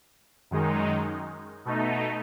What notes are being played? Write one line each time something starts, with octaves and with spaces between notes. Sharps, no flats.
F#2 D#3 G#3 D#4
B2 A3 D#4